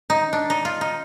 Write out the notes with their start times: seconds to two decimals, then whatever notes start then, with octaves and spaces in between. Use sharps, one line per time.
0.10 D#4
0.33 D4
0.50 D#4
0.65 F4
0.81 D#4